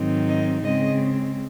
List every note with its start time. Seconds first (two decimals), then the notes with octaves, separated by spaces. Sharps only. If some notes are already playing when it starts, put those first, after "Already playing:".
Already playing: G#2 D#3 F#3 C4 D#4
0.29 D#5
0.64 C#3 G#3 C4 D#5